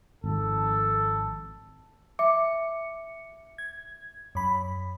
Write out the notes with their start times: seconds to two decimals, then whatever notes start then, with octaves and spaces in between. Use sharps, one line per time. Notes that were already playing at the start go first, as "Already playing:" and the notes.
0.24 G#1 F3 A4
2.19 E5 D6 C#7
3.58 G#6
4.35 F#2 B5